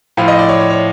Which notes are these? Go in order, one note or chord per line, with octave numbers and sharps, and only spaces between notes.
A2 F3 F5
D#5
D5
C#5
C#5
C#5